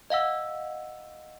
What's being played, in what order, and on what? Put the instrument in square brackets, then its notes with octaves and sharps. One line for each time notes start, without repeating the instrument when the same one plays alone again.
[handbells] D#5 F5 F#5 E6